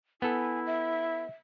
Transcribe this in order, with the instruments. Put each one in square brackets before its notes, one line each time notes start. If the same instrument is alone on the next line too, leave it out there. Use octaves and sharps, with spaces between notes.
[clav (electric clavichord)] B3 A4 [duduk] E4 [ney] G#5
[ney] E5